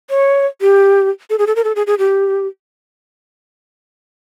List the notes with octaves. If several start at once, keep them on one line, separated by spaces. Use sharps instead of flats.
C#5
G4
A4
G#4
A4
A#4
A4
G#4
G#4
G4